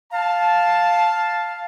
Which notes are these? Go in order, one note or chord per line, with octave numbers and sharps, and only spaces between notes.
F5 A5